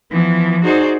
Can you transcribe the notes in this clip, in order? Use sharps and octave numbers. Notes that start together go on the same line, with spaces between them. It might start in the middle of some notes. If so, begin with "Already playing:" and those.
E3 F3 B3
D#4 F#4 G#4 C5 D5